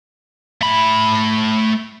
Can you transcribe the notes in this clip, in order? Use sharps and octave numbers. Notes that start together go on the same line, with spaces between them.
A3 B5